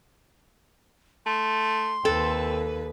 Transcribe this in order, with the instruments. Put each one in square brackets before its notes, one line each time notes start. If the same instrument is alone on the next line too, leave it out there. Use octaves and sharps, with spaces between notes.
[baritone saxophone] A3 [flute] C6
[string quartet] D#2 B4 [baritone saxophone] C4 [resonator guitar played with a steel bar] A4